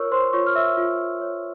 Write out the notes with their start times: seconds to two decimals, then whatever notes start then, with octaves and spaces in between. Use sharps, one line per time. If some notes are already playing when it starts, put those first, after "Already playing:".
Already playing: F4 A#4 C#5 C#6 E6 F6
0.12 C5 C6
0.33 F4 C#5 C#6
0.47 F6
0.55 E5 E6
0.77 F4
1.21 C#5